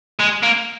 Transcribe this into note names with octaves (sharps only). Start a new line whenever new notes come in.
G#3
A#3